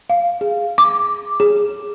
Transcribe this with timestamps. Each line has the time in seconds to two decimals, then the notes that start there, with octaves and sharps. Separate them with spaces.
0.10 F5
0.41 G#4
0.78 D6
1.40 G#4